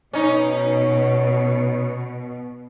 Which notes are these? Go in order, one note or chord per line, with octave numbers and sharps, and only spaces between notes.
B2 C#4 D#4